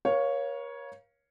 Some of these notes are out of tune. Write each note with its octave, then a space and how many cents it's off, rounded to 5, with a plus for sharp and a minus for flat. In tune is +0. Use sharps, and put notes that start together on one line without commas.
A#4 +40 C#5 +0 F5 +0